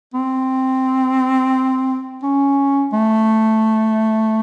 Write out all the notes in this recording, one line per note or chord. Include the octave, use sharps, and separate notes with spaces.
C4
C#4
A3